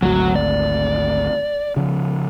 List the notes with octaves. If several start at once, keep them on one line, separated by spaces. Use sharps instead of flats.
G#1 D2 F#3 F#4
D5
C#3 F3